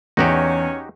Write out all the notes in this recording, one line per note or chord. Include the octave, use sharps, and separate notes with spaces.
E2 C#4 D#4 F#4 G4